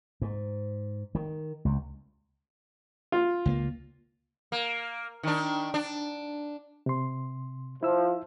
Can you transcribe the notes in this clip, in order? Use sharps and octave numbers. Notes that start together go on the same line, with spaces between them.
G#2
D#3
C#2
F4
C#2 F3 A#3
A#3
D#3 D4
D4
C3 C6
F3 E4 E6